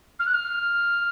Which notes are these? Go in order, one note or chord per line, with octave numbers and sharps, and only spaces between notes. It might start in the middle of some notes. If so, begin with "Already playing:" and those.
F6
F#6
F6